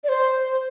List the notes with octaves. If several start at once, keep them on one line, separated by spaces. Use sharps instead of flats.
D5
C5